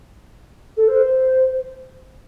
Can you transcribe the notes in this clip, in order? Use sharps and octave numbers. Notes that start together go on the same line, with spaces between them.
A4
C5